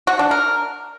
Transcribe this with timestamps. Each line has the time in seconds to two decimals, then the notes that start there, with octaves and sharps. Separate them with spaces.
0.07 F#4
0.19 D4
0.31 A#4